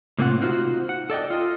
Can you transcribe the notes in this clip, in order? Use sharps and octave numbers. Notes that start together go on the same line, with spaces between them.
A2 C3 A#3 C4 F4 F#5
D#4 F4 F#4 C5
F#5
A4 D5 D#5 G5
F4 D#5